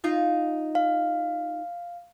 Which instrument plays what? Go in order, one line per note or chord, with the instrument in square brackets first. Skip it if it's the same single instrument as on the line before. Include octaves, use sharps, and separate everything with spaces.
[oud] D#4 F4
[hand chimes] F5